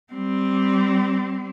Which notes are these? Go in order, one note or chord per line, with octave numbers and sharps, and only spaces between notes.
G3 C4